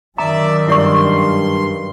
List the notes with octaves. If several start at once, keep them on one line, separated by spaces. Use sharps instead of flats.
F#2 D#3 D5 E5 A#5
G2 E4 D5 C6 C#6